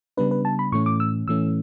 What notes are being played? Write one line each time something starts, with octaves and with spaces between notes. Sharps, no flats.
C#3 G3 B3 D4 B4
B4
A5
B5
A2 E3 A3 C#4 C#6
D6
E6
A2 E3 A3 C#4 E6